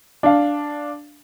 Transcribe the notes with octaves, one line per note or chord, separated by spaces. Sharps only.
D4 F5